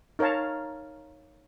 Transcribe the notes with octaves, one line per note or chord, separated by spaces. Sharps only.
D#4 A#4 C#5 F5 A5